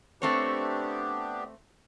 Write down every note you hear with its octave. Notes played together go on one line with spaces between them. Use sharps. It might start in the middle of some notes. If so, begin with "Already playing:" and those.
A3 B3 C4 D4 G4 C#5